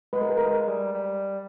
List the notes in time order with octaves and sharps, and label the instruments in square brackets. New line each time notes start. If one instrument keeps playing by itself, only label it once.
[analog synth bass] G#3 [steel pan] B4
[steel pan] A#4
G#4
[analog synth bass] G#3 [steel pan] A#4
[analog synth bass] G3
G3